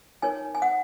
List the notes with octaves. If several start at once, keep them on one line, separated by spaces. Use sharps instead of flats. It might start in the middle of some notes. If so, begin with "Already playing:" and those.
D#4 A#4 C#5 G#5
G#5
F#5